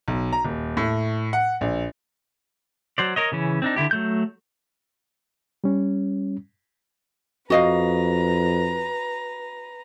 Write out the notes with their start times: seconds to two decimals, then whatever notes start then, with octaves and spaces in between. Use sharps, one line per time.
0.08 B1
0.33 A#5
0.44 D#1
0.77 A2
1.33 F#5
1.61 A#1
2.98 F#3 C5 D5
3.16 A#4 C#5 D#5
3.32 C#3 E3 C#4
3.62 C4 D4 D#4
3.76 D3 D#3 E4 G4
3.91 F#3 A3 G6
5.64 G3 C#4
7.50 F2 F#4 B4 D#5 F5 A#5